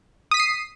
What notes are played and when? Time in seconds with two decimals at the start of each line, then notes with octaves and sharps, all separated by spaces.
0.31 D#6
0.34 B6
0.37 D#7
0.40 C7